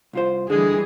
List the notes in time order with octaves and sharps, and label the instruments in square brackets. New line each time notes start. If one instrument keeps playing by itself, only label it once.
[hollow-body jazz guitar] C2 F4 C5
[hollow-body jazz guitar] D3 [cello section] E3 G3 G#4 [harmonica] G#3